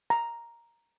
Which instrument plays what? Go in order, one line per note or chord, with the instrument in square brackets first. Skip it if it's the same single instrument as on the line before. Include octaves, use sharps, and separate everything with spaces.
[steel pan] A#5